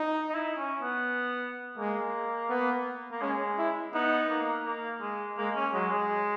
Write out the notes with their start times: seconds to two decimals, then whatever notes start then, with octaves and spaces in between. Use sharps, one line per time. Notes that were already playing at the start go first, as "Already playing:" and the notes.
Already playing: D#4
0.29 D#4
0.34 E4
0.57 C#4
0.82 B3
1.78 G#3 A#3
2.49 B3
3.11 A#3
3.22 G#3 C#4
3.58 E4
3.93 B3 D#4
4.30 A#3
4.65 A#3
5.01 G#3
5.37 G#3 A#3
5.55 C#4
5.73 F#3 G#3
5.91 G#3